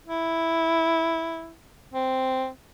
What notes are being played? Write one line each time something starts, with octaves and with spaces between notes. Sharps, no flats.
E4
C4